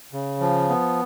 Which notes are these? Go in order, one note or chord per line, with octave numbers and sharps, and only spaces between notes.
C#3
F3
B3